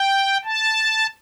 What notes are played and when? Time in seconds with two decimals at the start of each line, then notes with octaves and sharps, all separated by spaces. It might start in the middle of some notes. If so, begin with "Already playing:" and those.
Already playing: G5
0.45 A5